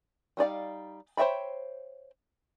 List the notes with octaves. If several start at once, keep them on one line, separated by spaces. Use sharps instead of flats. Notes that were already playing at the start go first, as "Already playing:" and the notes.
G3 D#4 D5 F5
C5 C#5 E5 G5 B5